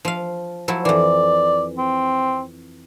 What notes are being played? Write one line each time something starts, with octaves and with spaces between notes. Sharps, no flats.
F3 F5
F3 F#3 E4
F2 E3 D5
C4